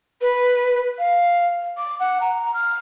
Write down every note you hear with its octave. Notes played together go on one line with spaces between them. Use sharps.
B4
F5
D6
F#5
A#5
F6